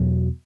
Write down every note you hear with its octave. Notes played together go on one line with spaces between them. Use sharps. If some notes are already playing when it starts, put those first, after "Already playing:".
Already playing: E2 B2 F#3